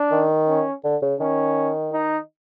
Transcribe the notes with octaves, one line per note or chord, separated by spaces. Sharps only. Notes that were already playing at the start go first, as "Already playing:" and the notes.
Already playing: D4
D#3
C#4
D3
C#3
D#3 C#4
D#4